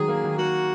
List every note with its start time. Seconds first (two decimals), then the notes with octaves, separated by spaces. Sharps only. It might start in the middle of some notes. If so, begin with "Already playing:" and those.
Already playing: D#3 F#3 G#3 G#4
0.08 A#3
0.24 D#3
0.38 A#3 F#4